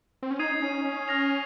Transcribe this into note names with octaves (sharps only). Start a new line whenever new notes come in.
C4
C#4
D#4 D#6 G#6 C7 D#7
D#4
C#4
C#4
F6 A#6 F7